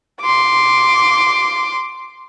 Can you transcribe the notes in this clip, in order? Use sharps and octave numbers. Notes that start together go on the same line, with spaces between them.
C6 D6